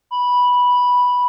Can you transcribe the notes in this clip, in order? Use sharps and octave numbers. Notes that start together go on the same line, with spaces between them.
B5